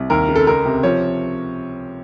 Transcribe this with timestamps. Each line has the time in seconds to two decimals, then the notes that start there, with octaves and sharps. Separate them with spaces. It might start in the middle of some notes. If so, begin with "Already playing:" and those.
Already playing: C2
0.10 D#2 A#4
0.29 C#3
0.36 A4
0.47 C#2 A#4
0.65 C3
0.83 F3 C#5